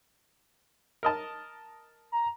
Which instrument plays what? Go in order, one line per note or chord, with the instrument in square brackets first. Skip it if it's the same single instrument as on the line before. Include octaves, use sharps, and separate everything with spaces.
[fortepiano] A#4 D#5 A5
[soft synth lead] A#5